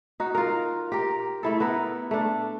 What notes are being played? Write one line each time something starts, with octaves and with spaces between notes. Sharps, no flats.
D#4 F#4
F4 A#4
G4 A#4
A3 E4 A4
B3 E4 A#4
A3 D4